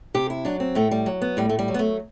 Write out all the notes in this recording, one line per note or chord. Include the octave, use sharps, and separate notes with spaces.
C3 G4
E4
F#3 D4
C4
A2 A3
G3
F#3
B3
A2 G3
A3
G3
F#3
B3
A3